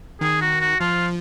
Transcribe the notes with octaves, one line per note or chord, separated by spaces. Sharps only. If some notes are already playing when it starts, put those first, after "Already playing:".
D#3 G#4
F#4
F#4
F3 F4